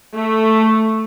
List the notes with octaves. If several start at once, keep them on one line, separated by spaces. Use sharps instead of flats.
A3